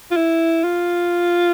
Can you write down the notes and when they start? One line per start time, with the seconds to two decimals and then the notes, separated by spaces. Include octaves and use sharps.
0.11 F4
0.17 E4
0.63 F4